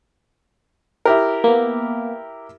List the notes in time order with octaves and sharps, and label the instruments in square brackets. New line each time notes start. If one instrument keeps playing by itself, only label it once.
[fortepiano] E4 G4 A#4
[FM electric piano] A#3 B3